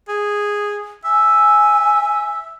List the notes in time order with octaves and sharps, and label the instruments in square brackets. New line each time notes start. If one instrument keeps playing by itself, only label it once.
[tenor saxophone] G#4
[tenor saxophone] E5 [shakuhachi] G#5